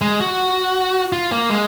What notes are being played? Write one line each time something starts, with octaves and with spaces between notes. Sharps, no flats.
G#3
F#4
F4
A#3
G#3